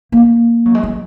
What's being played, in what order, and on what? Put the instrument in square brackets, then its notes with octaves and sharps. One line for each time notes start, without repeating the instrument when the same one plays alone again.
[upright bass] A#3
F#3
G#3
F#3